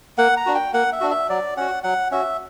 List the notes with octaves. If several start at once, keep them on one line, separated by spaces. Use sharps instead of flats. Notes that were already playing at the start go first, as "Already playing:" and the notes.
A#3 F#5
A#5
D4 F#4
G5
A#3 F#5
E5
D4 F#4
E5
F#3 D5
C#4 F#4 F#5
F#3 F#5
C#4 F#4 E5